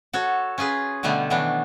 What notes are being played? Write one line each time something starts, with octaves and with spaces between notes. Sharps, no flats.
F#4 A4 C#5
C#4 F4 G#4 B4
B2 D3 G3 A3 B3
D#3 E3 F#3 B3 D4